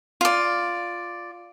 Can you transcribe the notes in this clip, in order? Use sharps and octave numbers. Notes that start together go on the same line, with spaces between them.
F4 D5